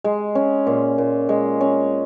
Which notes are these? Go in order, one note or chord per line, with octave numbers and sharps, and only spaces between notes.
G#3
C#4
A#2
A#2
G#3
C#4